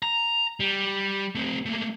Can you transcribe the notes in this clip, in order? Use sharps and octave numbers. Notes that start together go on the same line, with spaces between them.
A#5
G3
A3 C4
A3 A#3